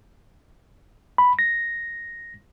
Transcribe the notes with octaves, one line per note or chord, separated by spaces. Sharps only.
B5
A#6